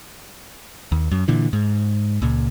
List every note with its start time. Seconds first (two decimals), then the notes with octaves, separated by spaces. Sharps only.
0.92 D#2
1.11 F#2
1.28 A#2 D3 E3
1.53 G#2
2.22 C#2 A#2